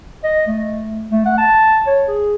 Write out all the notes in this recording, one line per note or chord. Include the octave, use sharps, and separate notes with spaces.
D#5
A3
A3
F#5
A5
C#5
G#4